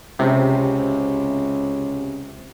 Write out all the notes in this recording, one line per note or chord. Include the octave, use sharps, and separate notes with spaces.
C#2 C3